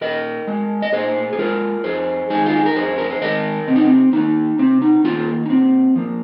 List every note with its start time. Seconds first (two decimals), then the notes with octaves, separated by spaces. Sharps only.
0.01 A#2 A#4 D#5
0.47 G#3
0.82 D#5
0.93 A#2 G#4 C5
1.33 G#4
1.38 G#3 F4 A#4
1.84 F2 G#4 C5
2.30 D#3 G#3 D#4 G#4
2.46 F4
2.56 G#4
2.66 A#4
2.76 F2 G#4 C5
2.98 A#4
3.10 C5
3.21 D#3 G#3 A#4 D#5
3.68 C3 C4
3.76 D#4
3.85 C4
4.13 D#3 A#3 D#4
4.59 C3 C4
4.82 D#4
5.04 D#3 A#3 C4 F4
5.46 D#4
5.50 A#2 C4
5.96 F3 A#3